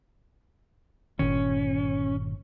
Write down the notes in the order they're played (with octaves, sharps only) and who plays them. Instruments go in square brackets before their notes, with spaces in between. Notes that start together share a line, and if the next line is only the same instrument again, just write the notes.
[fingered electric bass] G1 A#2 D#3 [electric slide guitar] C#4